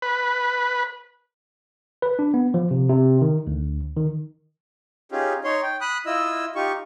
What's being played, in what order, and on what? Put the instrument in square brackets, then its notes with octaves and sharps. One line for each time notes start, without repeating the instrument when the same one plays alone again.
[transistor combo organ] B4
[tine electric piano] B4
D4
B3
F3
C3
C3
D#3
D2
D#3
[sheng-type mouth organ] C#4 D#4 F4 G4 G#4
D#4 C#5 C6
G5
B5 D#6 F#6
E4 F4 D#5 E6
D#4 F4 G4 C#6